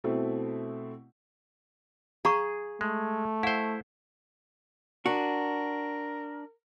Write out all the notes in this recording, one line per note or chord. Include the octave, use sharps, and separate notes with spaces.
B2 A3 C4 E4
G#4 F5 A#5 C#6
G#3 A3
E4 C5 F5 F#5
D4 F#4 A#4